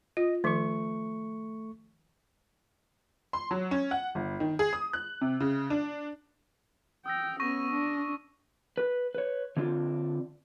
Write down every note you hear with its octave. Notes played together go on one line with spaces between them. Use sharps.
F4 D#5
D#3 F3 A3 C#6
C6
F#3
C#4
F#5
G1
D#3
G#4
D#6
F#6
C3
C#3
D4
G5 D#6 E6 A#6
B3 C#4 C#6 A#6 D#7
D4
B4
B4 C#5
D3 C4 D4 F4